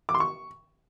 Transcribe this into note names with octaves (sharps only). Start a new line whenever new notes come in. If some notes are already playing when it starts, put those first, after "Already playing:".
D6
C6
C#6